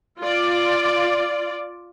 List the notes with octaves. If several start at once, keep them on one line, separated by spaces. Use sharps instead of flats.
F4 D5